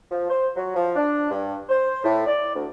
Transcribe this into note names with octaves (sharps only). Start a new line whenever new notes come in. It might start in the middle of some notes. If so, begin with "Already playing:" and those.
F3
C5
F#3
F3
D4
G2
C5
A2
D5
D2